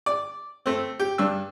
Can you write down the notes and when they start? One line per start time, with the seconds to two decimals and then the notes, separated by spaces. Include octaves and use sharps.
0.06 D5
0.66 A3 C4
0.99 G4
1.18 G2 D4 E6